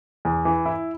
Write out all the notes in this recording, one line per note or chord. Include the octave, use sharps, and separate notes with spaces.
E2
E3
E4